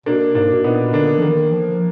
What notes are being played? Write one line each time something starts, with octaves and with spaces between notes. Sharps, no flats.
B2 A#3 D4
G#2 A#3 D4
B2
A#2 B3 D#4
D3 A#3 D4
F3
D#3 A#3
F3